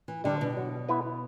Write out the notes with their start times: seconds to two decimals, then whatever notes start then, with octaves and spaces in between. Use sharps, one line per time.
0.08 E3
0.24 D3 G3 D4
0.41 B2
0.57 F#3
0.89 B3 E4 B4